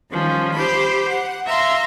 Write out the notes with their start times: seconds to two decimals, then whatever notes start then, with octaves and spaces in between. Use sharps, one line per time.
0.11 D#3 F3 G3 C#4
0.53 G4 C5 B5
1.07 F#5
1.46 E5 F5 A#5 C6